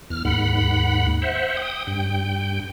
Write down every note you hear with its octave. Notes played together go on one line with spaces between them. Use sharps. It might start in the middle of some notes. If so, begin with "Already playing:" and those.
E2 F6
D#2 G#2 F#5 B5
C5 E5 F#5
G5 D#6
G2 G5